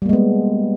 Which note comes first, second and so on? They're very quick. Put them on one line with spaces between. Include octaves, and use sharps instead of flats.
G3 A#3 G#3 B3